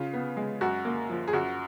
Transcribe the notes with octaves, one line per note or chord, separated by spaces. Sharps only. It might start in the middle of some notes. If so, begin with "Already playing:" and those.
Already playing: C#3 F4
B3
G#3
F#2 F#4
A#3
F3
G#4
F#2 F#4